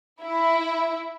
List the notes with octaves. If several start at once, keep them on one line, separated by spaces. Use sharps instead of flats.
E4